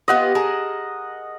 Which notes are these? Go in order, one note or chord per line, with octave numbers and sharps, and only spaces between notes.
B3 F4 G4 D#5 F#5
G#4 A#4 A5